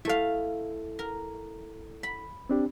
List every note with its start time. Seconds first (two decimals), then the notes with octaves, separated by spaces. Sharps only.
0.05 A3 E4 A4 F5
0.99 A#4
2.03 B5
2.49 C4 D4 G4